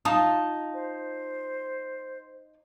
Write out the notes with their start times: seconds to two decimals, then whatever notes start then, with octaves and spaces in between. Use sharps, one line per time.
0.05 D#4 F4 A5 D#6
0.74 C5